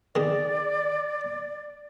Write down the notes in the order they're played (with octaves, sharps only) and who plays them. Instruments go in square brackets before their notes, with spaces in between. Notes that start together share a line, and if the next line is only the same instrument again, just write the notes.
[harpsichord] D#3 G#4 [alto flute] D5